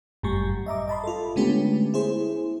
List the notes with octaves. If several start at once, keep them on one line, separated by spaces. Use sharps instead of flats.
G1 F#2 A2 G3 C#6
D#5 E5 A#5 D6
D#5 A5 B5 C6
F4 A4
D3 G#3 A3 B3 C#4 G4
E4 G#4 C5